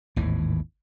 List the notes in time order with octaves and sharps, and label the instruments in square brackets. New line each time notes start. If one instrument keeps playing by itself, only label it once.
[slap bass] G#1 D#2 A2 E3